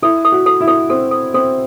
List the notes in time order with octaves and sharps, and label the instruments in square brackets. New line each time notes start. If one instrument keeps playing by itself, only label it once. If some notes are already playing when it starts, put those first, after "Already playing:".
[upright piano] E4 [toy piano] A4
[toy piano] A4
[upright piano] F#4
[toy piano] A4
[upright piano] E4
[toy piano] A4
[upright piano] C4 [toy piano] A4
[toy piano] A4
[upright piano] C4 [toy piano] A4